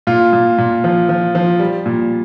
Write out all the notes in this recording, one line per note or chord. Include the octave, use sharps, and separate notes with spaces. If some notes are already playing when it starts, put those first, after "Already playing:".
A#2 F4
A#2
A#2
F3
F3
F3
G3
A#2